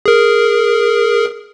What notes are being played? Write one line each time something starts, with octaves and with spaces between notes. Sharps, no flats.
G#4 A#4